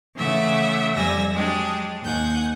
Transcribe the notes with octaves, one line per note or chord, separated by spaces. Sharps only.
C#3 E3 A3 E5 F#5 D6
F2 G3 G#5 E6 A#6
F#3 G#3 D4 G4 G#4
D#2 F#5 G#5 G6